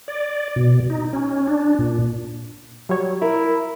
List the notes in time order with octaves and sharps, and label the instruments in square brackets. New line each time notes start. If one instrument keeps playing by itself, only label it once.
[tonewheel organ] D5
B2
D#4
C#4
D4
A#2
[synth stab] F#3 G3 C#5
[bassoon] E4 [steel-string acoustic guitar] A#4